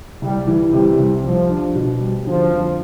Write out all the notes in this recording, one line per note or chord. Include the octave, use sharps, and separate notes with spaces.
C2 G3
E3
C3 G3
C2
C2 F3
D4
B2
G3
D3 F3
F2